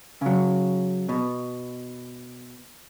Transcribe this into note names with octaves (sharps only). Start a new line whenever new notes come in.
C#3 F#3
B2